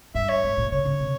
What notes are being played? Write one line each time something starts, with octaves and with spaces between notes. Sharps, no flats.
G2 E5
C#5
G#2
A#2
C#3 C#5
C#3
C3